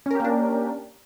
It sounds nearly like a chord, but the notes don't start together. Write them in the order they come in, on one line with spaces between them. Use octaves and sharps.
C#4 A#4 G4 A#3 D4